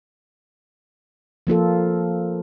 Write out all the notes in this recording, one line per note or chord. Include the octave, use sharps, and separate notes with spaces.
F3 A#3 F4 A4